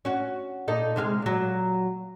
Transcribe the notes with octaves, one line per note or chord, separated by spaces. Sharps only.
C#4 F#4
A#2 D#4 A4
C3 G#3 F5
A#2 F#3